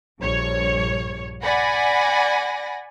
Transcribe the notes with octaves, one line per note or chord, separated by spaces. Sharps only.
A#1 G2 C#5
D5 F#5 G#5 B5 A#6